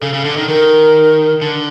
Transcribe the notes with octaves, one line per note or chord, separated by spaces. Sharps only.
C#3 A4
C#3
D3
D#3
D#3 A#4
D3